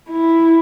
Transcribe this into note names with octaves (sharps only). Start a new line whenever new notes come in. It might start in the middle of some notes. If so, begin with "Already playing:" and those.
E4